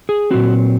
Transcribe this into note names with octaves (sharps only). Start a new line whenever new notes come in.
G#4
A#2 F#3 C4 F#4